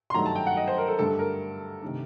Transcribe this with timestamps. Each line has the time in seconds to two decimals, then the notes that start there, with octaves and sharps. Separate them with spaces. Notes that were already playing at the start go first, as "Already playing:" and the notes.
0.10 C6
0.14 G2 D#3 F#3 A3 D#4 A#5
0.26 A5
0.35 G5
0.47 F#5
0.57 D#5
0.67 C5
0.78 A#4
0.88 A4
0.99 G2 D3 A3 D4 A4
1.19 A#4
1.82 C3 D#3 A3 D4